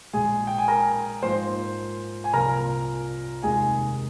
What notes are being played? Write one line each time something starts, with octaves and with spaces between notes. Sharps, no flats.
A#1 A#2 G#3 G#4 G#5
G5
G#5
A#4 A#5
G#2 F3 A#3 C5 C6
G#5
C2 A#2 F3 A#4 A#5
F1 D#2 D#3 G#3 D#4 G#4 G#5